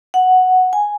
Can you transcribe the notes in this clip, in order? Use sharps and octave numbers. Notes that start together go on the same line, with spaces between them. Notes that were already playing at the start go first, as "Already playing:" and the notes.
F#5
G#5